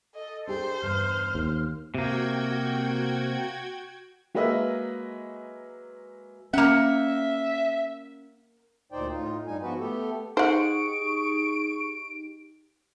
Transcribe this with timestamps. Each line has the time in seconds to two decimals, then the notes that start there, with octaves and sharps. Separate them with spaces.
0.15 A4 D#5
0.47 D4 G4 G#4 C5
0.82 E2 G2 C#3 F6
1.35 D#2
1.95 C3 A#3 F#4 G5 G#6
4.35 F#3 G#3 A#3 B4 D#5 E5
6.53 A#3 C#4 E5 F#5
8.92 D2 A#2 D#4 C5 D5 G5
9.11 A2 D#4 F4
9.47 G2 G3 D#4 G#5
9.62 G#2 F3 B3 F#4 B4
9.79 A3 B3 G4 A4
10.37 D#4 G4 G#4 C5 F#5 C#6 D7